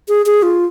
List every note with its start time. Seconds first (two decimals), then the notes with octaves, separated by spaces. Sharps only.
0.08 G#4
0.26 G#4
0.43 F4